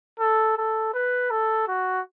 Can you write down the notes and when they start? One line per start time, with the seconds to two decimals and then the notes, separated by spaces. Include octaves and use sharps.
0.19 A4
0.57 A4
0.93 B4
1.30 A4
1.68 F#4